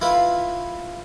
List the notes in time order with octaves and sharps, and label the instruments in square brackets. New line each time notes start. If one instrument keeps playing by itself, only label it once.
[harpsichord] E4 F4 B4